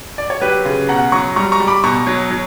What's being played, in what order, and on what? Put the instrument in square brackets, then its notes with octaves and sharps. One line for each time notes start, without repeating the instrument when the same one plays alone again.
[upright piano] D5
C#5
F#3 G4 B4
C#3
B2 F#5 A#5
F#3 A#5 C#6
G3 A#5 C#6
A#5 C#6
G3
B5 D6
B2 A#5 C#6
F#3
F#3